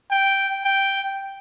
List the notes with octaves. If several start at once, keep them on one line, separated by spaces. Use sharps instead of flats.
G5
G5